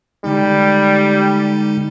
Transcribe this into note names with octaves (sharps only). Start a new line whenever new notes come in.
D3 G3 G#3 D#4